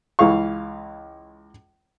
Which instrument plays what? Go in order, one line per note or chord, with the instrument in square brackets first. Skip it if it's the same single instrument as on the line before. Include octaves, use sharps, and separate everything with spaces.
[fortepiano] C#2 E3 G#4 F5 C#6